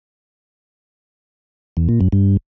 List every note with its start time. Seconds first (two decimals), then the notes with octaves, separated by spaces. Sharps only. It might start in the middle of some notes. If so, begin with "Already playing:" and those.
1.77 E2
1.89 A#2
2.01 F#2
2.12 G2